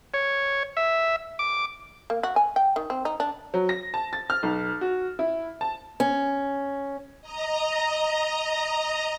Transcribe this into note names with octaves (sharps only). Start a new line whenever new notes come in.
C#5
E5
D6
A#3
F#4
G#5
G5
D#3
C4
D#4
D4
F#3
A#6
A5
A6
F6
B1
F#4
E4
A5
C#4
D#5 A#5